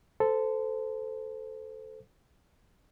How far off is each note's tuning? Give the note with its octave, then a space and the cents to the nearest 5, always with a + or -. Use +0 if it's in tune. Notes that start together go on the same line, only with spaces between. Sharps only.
A4 +0 C5 -20